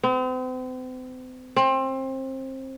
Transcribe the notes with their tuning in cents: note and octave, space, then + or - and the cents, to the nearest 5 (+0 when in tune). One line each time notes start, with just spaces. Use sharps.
C4 -40
C4 +25